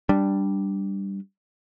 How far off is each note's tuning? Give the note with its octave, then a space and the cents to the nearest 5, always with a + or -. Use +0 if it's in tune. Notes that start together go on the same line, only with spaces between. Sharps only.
G3 +0 D4 +0